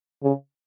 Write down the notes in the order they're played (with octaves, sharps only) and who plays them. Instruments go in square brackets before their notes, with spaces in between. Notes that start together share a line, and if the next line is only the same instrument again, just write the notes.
[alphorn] C#3